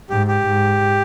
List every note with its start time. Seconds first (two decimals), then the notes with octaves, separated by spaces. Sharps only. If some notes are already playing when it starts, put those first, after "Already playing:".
0.10 G#2 G4
0.28 G4
0.46 G#2